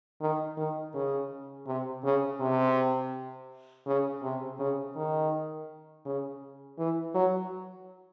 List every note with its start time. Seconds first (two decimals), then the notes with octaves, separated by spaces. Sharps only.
0.21 D#3
0.57 D#3
0.94 C#3
1.67 C3
2.04 C#3
2.40 C3
3.87 C#3
4.23 C3
4.59 C#3
4.96 D#3
6.06 C#3
6.79 E3
7.15 F#3